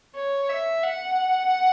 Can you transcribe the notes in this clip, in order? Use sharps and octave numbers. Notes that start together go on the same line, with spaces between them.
C#5
E5
F#5